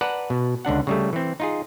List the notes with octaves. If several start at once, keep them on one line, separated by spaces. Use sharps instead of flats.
B4 D5 F#5 A5 A#5
B2
C#2 D3 D4 F#5
C#3 G3 A3
E3 C4
D#4 F4 G#4